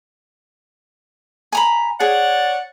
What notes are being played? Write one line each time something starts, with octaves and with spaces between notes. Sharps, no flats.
G#5 A#5 B5
G#4 C#5 D5 F#5